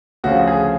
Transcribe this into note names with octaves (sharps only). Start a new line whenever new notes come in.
D2 C#3 F3 F#4
G#4